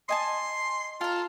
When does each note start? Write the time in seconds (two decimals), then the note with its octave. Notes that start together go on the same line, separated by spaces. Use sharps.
0.09 D#5 G#5 A5 C6
1.01 F4 A4 A#5